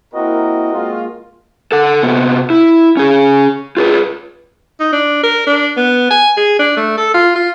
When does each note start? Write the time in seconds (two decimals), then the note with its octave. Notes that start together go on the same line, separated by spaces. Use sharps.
0.14 A#3 C4 E4 F#4 A#4 D#5
0.73 G#3 A#3 F4
1.72 A4 F#5
2.03 C3 B3
2.50 E4
2.97 C#4 G#4
3.77 F4 G#4 B4
4.80 D#4
4.93 D4
5.23 A#4
5.47 D4
5.77 B3
6.11 G#5
6.37 G#4
6.59 D4
6.77 A3
6.98 A4
7.14 F4
7.35 F4